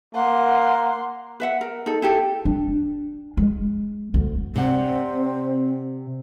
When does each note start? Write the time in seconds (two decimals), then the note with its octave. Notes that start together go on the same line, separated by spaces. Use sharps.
0.15 A#3 F#5 C6
1.40 B4 E5 F#5
1.61 A#4
1.86 D#4 A4
2.02 E4 G4 A4
2.45 D4
3.37 G#3
4.14 D2
4.56 C3 C4 D5 F#5